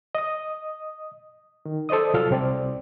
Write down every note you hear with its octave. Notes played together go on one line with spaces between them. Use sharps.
D#5 D#6
D#3
A4 C5 D5 D#5 D#6
C2 F#3 F4 A4 F6
C2 C4 D5